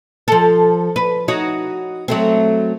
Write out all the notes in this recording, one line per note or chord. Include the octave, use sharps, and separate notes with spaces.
F3 A4
B4
D#4 F#4 C#5
F#3 A3 C4